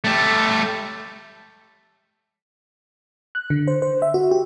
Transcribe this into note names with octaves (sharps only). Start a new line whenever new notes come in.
A3 G4
F#6
D3
C5
C5
E5
F#4
G4